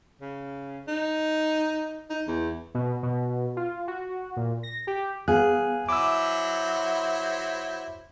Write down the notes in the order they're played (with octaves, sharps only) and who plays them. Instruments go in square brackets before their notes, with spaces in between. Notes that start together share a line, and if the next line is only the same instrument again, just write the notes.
[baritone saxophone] C#3
D#4
D#4
E2
[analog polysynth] B2
B2
F4
F#4
A#2
A#6
G4
[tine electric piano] B3 F5 F#6 [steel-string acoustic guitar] G#4
[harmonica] F#3 E4 C5 [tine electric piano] D6 E6